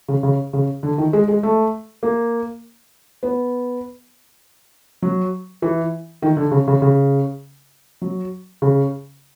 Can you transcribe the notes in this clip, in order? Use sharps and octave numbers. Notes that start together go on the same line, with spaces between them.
C#3
C#3
C#3
D3
D#3
G#3
G#3
A3
A#3
B3
F#3
E3
D#3
D3
C#3
C#3
C#3
F#3
C#3